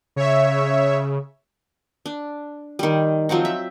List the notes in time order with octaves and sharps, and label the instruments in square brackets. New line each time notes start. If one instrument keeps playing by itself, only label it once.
[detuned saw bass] C#3 [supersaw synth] C#5 E5
[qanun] D4
D#3 G3
F3 F#3 C4 D#4
E5